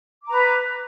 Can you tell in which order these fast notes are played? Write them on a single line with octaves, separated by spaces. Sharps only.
D6 A#5 B4